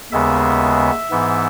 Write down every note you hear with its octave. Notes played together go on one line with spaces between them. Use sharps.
D#2 C#3 G#3 B3 E5
G#2 E3 B3